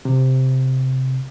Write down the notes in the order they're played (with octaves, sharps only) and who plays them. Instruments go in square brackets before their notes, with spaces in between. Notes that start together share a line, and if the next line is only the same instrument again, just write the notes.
[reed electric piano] C3